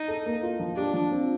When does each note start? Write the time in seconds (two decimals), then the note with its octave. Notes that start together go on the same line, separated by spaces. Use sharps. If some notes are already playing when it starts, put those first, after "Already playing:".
Already playing: D#4
0.08 A4
0.26 A#3
0.43 F4
0.60 F3
0.77 D4 G4
0.94 F3
1.11 C4